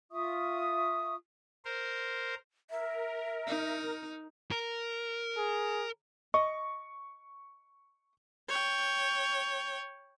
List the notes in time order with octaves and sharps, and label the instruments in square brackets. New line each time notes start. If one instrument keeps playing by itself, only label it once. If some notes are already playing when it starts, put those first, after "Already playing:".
[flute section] F4 E5 C#6 D#6
[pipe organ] A#4 C5
[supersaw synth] A#4 [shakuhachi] E5
[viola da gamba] D#4
[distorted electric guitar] A#4
[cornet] G#4
[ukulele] D#5 [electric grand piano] C#6
[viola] C#5 G5